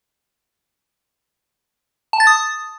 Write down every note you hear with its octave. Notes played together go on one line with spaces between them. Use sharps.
A5
A6
D#6